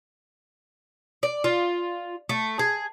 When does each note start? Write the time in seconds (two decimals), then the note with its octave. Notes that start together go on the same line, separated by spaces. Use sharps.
1.23 D5
1.44 F4
2.29 A3
2.59 G#4